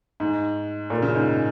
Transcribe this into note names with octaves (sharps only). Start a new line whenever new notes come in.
G#2
A#2
C#3
G#2